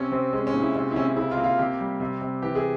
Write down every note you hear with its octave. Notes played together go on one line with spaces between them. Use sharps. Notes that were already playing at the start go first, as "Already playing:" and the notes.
Already playing: C3 C#4
C3 C4
G#3 C#4
C#4
A#2
E4
C3 C#4
E4
C3 C#4
C#4
C#3 E4
F4
A#3
F4
C3 G4
G3
C3
C3
E3 G4
G#4